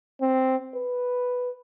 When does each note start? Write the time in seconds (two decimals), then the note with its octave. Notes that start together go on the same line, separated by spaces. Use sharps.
0.21 C4
0.75 B4